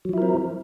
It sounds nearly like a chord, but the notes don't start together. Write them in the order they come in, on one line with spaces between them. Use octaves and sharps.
F#3 F3 E4 A#4 C4